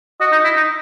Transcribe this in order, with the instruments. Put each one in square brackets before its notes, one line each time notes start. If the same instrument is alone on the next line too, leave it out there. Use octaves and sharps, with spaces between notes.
[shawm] F#4 [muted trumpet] D#5
[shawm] D#4
E4
D#4